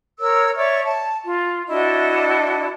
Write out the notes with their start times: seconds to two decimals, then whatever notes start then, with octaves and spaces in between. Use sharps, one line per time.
0.20 A#4 C#5 E6
0.56 C#5 D5 E5 C#6
0.83 A5
1.26 F4
1.68 D4 E4 F#4 D#5